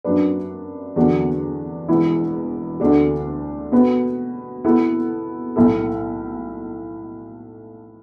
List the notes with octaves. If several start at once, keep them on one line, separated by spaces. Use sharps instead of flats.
F#2 F#3 D4 B4
E2 D3 F#3 D4 F#4
E1 E2 B2 B3 E4
D2 D3 A3 D4 F#4
B2 A3 F#4 B4
B2 B3 E4 A4
B1 A2 A3 E4 A4